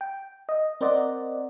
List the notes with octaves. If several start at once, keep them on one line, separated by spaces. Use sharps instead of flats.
G5
D#5
C4 A#4 C5 D5 D#5 F#5